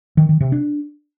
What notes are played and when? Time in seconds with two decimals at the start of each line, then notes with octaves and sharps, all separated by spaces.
0.17 D#3
0.29 D#3
0.40 C3
0.52 D4